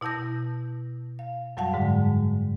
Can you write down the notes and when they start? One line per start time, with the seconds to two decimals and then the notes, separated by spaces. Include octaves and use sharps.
0.01 B2 E4 A5 G6 A#6
1.19 F5
1.57 F#2 F#3 G3 F5 F#5 A5
1.73 G#2 D3 G#3